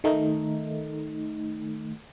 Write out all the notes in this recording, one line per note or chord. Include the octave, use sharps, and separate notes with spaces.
D#3 A3 D#4